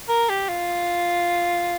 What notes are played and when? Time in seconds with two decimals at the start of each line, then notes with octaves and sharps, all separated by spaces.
0.09 A#4
0.29 G4
0.49 F4